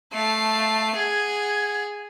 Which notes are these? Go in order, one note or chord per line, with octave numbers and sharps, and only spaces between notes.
A3 F5 A5 C7
G#4 F#5 G#6